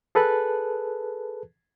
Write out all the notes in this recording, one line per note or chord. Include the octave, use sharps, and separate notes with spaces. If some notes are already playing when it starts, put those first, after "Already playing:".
G#4 A4 B4 A5 F#6